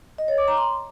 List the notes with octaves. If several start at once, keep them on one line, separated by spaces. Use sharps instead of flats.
D#5
C#5
D6
A#5
C6